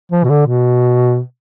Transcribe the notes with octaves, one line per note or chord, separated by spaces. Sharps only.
F3
B2
D3
B2